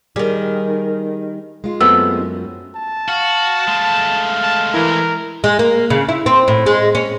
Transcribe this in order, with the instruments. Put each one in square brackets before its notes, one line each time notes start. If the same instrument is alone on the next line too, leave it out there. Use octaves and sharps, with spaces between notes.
[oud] D#3 G3 [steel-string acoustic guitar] G#4
[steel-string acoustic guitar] G#3 F4
[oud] F#2 [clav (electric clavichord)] A3 B3 C4 [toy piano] E6
[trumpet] A5
[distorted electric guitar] F#4 [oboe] F5
[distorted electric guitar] G#3 A3
[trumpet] A5
[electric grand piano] E3 E4 [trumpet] A#4
[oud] G#3
A#3
C#3
E4
C4
A2
G#3
C#4